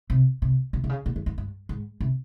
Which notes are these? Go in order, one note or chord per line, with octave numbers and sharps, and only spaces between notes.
C3
C3
C3
C3
C#3
A#2
E2
F2
G2
G#2
C3